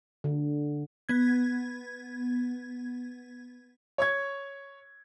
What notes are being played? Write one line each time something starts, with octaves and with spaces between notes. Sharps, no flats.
D3
B3 G#6
C#5 C#6 G#6